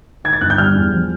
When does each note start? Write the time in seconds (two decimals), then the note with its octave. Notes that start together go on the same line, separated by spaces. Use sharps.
0.24 D#3 G#6
0.33 A6
0.41 G1 F#6
0.50 G6
0.58 G3 F6
0.75 E2
0.93 F3